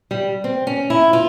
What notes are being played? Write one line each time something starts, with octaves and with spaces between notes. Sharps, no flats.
G3
C4
C#4
E4
F4